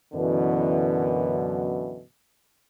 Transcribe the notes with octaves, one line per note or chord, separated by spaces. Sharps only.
F#2 B2 D3 E3